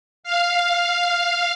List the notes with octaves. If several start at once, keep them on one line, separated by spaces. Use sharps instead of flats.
F5